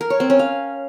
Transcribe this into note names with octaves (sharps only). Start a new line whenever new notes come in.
A#4
C#5
C4
C#4
F5